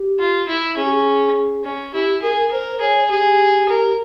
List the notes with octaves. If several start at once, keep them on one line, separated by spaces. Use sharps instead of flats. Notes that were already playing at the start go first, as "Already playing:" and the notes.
Already playing: G4
F4
E4
C#4 G#4
G4
G#4
C#4
E4 G4
G#4 A#4
A#4 C5
G#4 C#5
G4 G#4
A#4